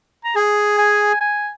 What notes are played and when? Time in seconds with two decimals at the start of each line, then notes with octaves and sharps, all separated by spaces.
0.24 A#5
0.36 G#4 G#5
0.78 G#5
1.21 G#5